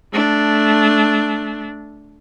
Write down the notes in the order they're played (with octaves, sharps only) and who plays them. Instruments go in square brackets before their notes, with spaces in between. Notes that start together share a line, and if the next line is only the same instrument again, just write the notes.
[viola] A3 D4